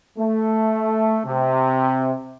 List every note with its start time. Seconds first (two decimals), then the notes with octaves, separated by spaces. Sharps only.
0.18 A3
1.26 C3